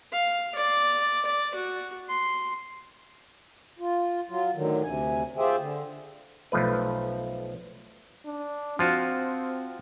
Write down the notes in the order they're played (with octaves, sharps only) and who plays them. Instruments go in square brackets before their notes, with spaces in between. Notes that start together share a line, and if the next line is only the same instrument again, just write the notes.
[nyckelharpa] F5
D5
D5
F#4
C6
[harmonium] F4
F#3 F4
A2 D3 D#3 F#3
D2 C3 G#5
F4 G4 G#4 C5 E5 G5
D3
[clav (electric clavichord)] B1 F3 A3 B4
[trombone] D4
[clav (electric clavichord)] F3 F4 F#4 [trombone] C4